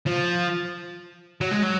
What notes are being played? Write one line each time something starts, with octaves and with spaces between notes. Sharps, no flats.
F3
F#3
G#3
F#3